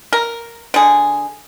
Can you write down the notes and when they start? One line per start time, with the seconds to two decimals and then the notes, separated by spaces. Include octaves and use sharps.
0.13 A#4
0.74 D3 G#4